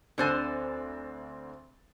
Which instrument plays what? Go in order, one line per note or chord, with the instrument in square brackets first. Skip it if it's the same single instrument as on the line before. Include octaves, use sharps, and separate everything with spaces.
[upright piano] D2 C4 A6 [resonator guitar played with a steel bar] D3 C5 G#5